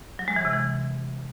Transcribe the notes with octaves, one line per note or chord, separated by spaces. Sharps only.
F#3
G#3
E3
C3
E3